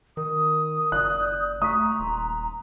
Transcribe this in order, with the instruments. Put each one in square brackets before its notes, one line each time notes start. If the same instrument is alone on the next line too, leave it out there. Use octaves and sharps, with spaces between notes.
[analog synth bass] D#3 [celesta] A#4 [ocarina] D#6
[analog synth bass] F#1 [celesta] D5 [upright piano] F#6
[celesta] D5 G6
[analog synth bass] A3 [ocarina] A#5 [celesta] C#6 B6 [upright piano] D#6
[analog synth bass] D#1 [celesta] C6